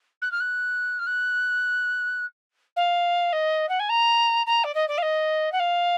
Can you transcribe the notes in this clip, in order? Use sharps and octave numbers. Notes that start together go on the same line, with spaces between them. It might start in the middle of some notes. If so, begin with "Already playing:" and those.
F#6
F6
F#6
F6
F#6
F5
D#5
F#5
G#5
A#5
A#5
D5
D#5
D5
F5
D#5
F#5
F5